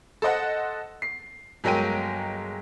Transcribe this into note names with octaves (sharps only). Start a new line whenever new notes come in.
A4 C5 D#5 F#5
C7
G1 F#3 G#3 A#4 G5 D#7